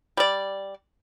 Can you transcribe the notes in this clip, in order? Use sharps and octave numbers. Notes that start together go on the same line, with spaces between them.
G3 D5